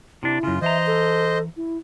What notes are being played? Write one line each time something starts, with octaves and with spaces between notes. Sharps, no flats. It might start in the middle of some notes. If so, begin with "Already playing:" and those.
C3 D4 E4
F#2 C#3 F4
E3 C5 D#5 E5 A#5
A4
E4